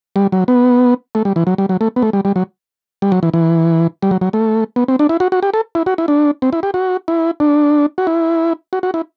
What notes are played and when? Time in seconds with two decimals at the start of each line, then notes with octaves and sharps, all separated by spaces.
0.16 G3
0.32 F#3
0.48 B3
1.15 A3
1.25 G3
1.36 E3
1.47 F#3
1.58 G3
1.69 F#3
1.81 A3
1.96 B3
2.02 A3
2.13 G3
2.25 G3
2.36 F#3
3.02 G3
3.12 F#3
3.23 E3
3.34 E3
4.02 G3
4.11 F#3
4.21 F#3
4.33 A3
4.76 B3
4.88 C4
4.99 D4
5.09 E4
5.20 F#4
5.32 F#4
5.43 G4
5.54 A4
5.75 E4
5.86 F#4
5.98 E4
6.08 D4
6.42 C4
6.53 E4
6.63 G4
6.74 F#4
7.08 E4
7.40 D4
7.98 F#4
8.07 E4
8.73 F#4
8.83 F#4
8.94 E4